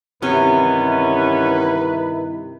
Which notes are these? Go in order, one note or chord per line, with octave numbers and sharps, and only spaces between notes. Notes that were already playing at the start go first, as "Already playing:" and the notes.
G2 C3 D#3 E3 B3 C#4 E4 B4